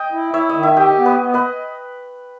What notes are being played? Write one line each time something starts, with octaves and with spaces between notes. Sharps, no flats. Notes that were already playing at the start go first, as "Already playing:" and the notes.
Already playing: D#5 G5
E4
E4 C#5 E5
D#5
D#3
E5
G4 D#5 G5
B3
B4 D#5
B3
B4 D#5